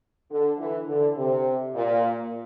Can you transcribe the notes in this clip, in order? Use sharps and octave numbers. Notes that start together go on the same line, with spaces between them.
D3
E3
D3
C3
A#2